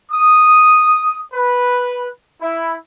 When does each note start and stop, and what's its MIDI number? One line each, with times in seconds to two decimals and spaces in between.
0.12 1.21 87
1.33 2.07 71
2.42 2.73 64